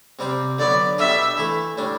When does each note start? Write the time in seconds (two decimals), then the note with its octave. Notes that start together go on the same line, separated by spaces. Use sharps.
0.19 C3 G3 C4 G4
0.58 D3 F#3 B3 D5
0.98 B2 G3 D4 A4 E5
1.37 E3 A3 E4 A4
1.78 A2 G3 D4